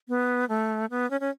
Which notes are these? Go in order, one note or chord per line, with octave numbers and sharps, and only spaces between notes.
B3
A3
B3
C#4
C#4